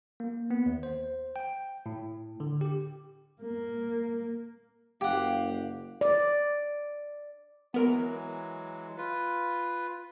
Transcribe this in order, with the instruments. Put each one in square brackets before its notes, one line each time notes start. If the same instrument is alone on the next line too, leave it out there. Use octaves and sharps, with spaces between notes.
[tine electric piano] A#3
B3
D#2
C5
G5
A2
D3
G4
[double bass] A#3
[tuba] F#1 [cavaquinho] G4 F#5 [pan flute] F5
[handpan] D5
[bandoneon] E3 F#3 G#3 [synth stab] B3 A#4
[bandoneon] F4 B4